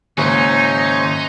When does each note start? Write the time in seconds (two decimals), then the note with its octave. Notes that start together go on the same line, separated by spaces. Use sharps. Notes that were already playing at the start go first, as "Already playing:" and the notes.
0.18 F#1 G#2 D#3 D#4 C5 C#5 G#5